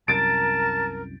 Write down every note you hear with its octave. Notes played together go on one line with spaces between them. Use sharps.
C2 F#2 A#4 A5 A6 D7